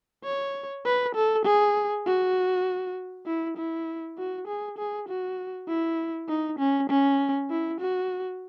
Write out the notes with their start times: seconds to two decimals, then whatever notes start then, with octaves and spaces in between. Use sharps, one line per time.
0.24 C#5
0.85 B4
1.15 A4
1.45 G#4
2.06 F#4
3.26 E4
3.57 E4
4.18 F#4
4.47 G#4
4.78 G#4
5.08 F#4
5.68 E4
6.29 D#4
6.59 C#4
6.89 C#4
7.50 E4
7.80 F#4